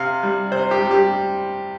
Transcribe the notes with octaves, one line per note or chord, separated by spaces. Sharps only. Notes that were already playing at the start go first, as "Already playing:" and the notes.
Already playing: C3 F5
G3
C3 C5
G4
G3
G4